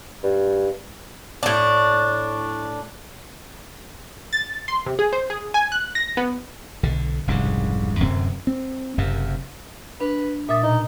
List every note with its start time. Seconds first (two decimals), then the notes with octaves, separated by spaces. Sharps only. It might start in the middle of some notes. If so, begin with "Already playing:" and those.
0.23 G2
1.43 A2 D4
4.33 A6
4.68 C6
4.86 C3
4.99 G#4
5.13 C5
5.30 G#4
5.54 G#5
5.72 F#6
5.95 A#6
6.17 B3
6.83 B1 D3
7.27 F1 C2 G#2 C#3
8.00 D1 F#2 C3 C4
8.47 C4
8.98 F#1 F#2 C3
10.01 D4 B4
10.49 A#2 E5 D#6 A6
10.63 B2 D#4